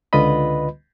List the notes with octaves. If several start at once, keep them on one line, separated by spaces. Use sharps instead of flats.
C#2 D3 F4 B4 D#5 B5